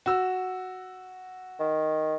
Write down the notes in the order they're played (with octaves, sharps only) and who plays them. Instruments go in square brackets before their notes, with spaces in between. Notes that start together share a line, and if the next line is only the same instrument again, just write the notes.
[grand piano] F#4 E6
[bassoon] D#3